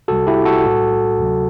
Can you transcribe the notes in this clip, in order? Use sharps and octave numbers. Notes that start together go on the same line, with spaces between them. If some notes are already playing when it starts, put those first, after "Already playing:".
C2 C3 G3 F#4 A4
E4 G4
F#4 A4
B1 A2 G3
D2 C3 F#3